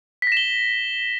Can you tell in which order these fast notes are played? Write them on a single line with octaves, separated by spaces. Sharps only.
B6 A#6 E7 G7